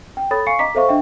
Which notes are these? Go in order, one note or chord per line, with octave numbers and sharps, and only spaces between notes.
G5
A4 C#5 B5 D#6 A6
F5 G#5 C#6 C7 C#7
D#5 A#5 D6 B6
A4 C5 E5 F5 C#6
D4 D#5 E5 G5